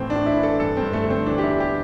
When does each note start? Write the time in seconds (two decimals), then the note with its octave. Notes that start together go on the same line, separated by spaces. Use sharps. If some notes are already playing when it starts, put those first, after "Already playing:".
Already playing: A2 E3 C4
0.10 D4
0.15 A2
0.26 E4
0.37 E3
0.43 A4
0.60 G2 A4
0.77 G2 C4
0.93 A3
1.04 D3
1.10 C4
1.26 E3 D4
1.38 G4
1.44 E2 E4
1.60 G4